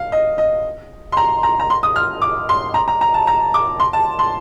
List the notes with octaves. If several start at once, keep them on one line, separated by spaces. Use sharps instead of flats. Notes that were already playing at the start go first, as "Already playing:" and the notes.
Already playing: F5
D#5
D#5
C6
A#5
A#5
A#5
C6
D#6
F6
D6
C6
A#5
A#5
A#5
A5
A#5
D6
C6
A5
C6